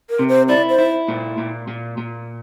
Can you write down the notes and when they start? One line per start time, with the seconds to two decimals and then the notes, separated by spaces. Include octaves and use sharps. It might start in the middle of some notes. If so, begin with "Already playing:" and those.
0.10 A#4
0.19 C3
0.29 C5
0.49 E4 D5
0.69 C5
0.79 E4
1.08 A#2
1.38 A#2
1.68 A#2
1.98 A#2